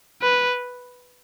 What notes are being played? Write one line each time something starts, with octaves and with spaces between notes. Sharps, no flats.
B4